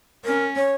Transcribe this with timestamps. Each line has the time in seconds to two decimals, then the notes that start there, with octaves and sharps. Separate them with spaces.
0.25 C#4 A#4
0.56 C#5